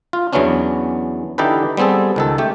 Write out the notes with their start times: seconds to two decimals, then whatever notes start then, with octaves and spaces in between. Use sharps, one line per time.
0.13 F4
0.33 E2 E3 F#3 B3 C#4 D4
1.38 D3 E3 D#4 G4 A4 B4
1.77 G3 B3 C4 G#4 A4
2.16 C#2 D#3 A4
2.38 A3 G4